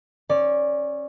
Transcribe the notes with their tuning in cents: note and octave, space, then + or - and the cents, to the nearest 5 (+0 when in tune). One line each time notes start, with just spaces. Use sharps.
C#4 -20 D5 +0